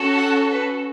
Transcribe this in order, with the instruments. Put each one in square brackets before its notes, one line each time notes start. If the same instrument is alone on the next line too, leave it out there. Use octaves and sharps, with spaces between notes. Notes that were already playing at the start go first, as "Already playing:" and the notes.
Already playing: [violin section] C#4 F#4 A4
F#5
B4